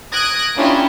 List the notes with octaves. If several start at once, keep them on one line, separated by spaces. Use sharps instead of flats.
D#6 F#6 G#6 A#6 D7
A#3 C#4 D4 E4 F4 G4